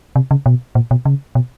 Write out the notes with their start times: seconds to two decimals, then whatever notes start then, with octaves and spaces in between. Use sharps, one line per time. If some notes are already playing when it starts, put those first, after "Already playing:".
0.16 C3
0.31 C#3
0.46 B2
0.75 A#2
0.91 B2
1.06 C#3
1.35 B2